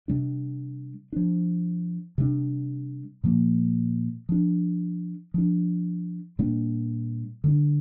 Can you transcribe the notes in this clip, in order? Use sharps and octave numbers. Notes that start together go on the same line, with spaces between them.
C3 G3 D4
F3 D4
C3 G3 D4
A#2 F3 A#3
F3 D4
F3 D4
A#2 G3 A#3 D4
D3 G3 D4